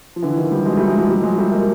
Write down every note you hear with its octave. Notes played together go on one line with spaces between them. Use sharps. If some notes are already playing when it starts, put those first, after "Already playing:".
F3
D3 E3
D#3 F3
F3 G3
F#3 G#3
G3 A3
F#3 G#3
F3 G3
F3 G3
F#3 G#3
G3 A3
G#3 A#3